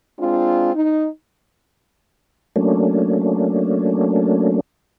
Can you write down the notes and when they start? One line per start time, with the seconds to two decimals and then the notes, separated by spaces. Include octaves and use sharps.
0.20 G#3 C4 D4 F4
0.75 D#4
2.56 F#3 A3 A#3 C#4 D4